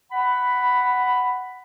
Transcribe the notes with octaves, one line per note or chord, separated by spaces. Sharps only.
F#5 B5